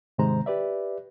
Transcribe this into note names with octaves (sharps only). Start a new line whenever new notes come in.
G#2 C3 D#3 G#3 C5 A#5
G4 B4 D5 E5